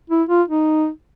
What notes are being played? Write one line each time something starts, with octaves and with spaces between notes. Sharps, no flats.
E4
F4
D#4